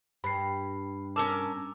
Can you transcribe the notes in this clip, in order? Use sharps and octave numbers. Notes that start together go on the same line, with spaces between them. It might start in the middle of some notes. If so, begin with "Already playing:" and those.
G2 B5 C7
C#4 A#4 A5 D6 E6